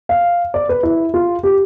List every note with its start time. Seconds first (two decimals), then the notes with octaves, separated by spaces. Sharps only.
0.09 F5
0.54 D5
0.69 B4
0.83 E4
1.14 F4
1.43 G4